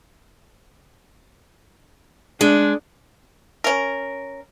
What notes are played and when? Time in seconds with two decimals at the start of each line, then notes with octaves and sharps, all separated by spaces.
2.41 G#3 D4
3.64 C#4 A#4